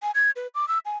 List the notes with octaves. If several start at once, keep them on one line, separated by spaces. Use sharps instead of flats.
G#5
G#6
B4
D6
E6
G#5